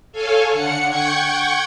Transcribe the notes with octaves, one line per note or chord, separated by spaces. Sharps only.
A4 C#5 F5 G#5
D3 F#5 C#7
F#5 G5 C#6 G6 G#6